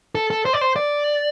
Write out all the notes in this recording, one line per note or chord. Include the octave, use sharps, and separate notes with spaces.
A4
A4
C5
D5
C5
D5